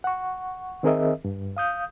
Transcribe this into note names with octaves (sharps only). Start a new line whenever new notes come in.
F#5 C#6
D#3 C4 G#4 A#4 D#5 E5
G2
F5 D#6 G6